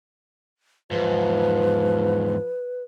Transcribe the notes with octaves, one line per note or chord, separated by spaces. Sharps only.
E2 G#2 F3 B4